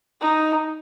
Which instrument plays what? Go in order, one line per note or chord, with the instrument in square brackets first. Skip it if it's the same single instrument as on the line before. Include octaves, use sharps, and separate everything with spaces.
[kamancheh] D#4